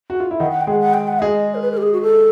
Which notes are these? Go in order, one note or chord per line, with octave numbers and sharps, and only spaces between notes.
F#4
F4
E4
D#3 D#4 F#5
F#5
G5
G#3 G#4 F#5
F#5
G5
F#5
G#3 G#4 D#5
A#4
B4
A#4
G4
G#4
F#4
A4